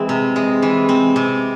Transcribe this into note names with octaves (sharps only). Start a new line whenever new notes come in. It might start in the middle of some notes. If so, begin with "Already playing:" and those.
Already playing: E3 G#3 C4
C3
G#3
E3
C4
C3